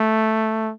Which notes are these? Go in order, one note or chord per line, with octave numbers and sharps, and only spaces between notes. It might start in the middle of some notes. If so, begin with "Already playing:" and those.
Already playing: A3